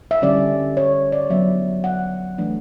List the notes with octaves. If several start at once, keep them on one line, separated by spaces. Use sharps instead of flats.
E5
D3 G3 C#4 D5
C#5
D5
D5
F#3 B3 D4 E5
F#5
E3 A3 D4